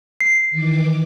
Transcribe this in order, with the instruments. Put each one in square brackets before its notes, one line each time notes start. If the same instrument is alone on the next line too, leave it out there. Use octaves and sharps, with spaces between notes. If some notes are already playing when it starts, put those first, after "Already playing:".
[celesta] C7
[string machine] D#3 E3 D6